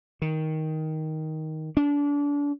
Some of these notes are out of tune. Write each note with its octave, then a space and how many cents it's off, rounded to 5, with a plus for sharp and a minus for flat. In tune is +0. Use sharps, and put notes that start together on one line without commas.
D#3 +10
D4 -30